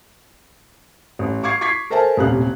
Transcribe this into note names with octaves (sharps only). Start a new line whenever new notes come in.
A1
F5 C#6 D6 G#6 C7
C#6 D6 G#6 B6 C7
A4 A#4 C5 E5 G#5 A5
D#1 A1 C3 F5 F#6